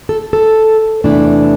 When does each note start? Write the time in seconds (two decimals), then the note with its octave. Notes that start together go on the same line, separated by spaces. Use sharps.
0.09 A4
0.33 A4
1.04 E2 C3 E3 A3 D4